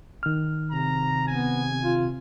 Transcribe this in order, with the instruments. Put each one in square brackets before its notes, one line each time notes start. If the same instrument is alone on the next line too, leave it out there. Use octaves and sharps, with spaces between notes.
[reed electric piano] D#3 F6
[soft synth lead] C3 [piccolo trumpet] A#5
[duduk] B3 [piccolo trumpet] G#5
[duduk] F4